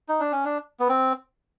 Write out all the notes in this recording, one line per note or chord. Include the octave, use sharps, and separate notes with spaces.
D#4
D4
C#4
D4
B3
C4